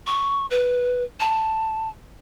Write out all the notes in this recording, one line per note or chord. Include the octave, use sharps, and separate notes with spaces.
C#6
B4
A5